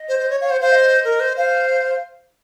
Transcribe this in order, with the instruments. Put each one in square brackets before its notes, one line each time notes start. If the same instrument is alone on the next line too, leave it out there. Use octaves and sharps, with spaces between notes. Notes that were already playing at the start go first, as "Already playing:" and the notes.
Already playing: [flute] D#5
[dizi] C5
C5
C#5
[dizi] C#5 [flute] F5
[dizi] C5 [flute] F#5
[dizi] C5 [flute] F5
[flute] D#5
[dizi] A#4
C5
[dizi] C5 [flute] F5